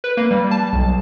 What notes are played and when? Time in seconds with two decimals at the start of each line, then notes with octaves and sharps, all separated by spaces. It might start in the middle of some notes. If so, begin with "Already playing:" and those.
0.04 B4
0.17 A#3
0.31 G3
0.51 A5
0.73 B1